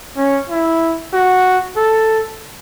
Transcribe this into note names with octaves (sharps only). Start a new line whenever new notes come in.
C#4
E4
F#4
A4